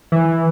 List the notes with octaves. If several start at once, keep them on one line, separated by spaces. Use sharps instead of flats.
E3